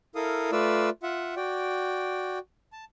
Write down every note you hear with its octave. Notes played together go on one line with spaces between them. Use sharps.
E4 A4 A#4 F5 D#6
A3 F4 B4 D5 E6
F4 E5 F#5
F#4 D5 G5
A5